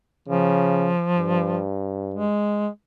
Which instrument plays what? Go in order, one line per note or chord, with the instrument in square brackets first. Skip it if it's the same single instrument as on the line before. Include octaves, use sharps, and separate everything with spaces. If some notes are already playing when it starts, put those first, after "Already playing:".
[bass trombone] C#3 [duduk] F3
[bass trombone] G2
[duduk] G#3